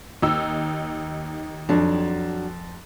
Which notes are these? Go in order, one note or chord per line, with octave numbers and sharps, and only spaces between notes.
D#2 D#4 E6
F2 F#3 D4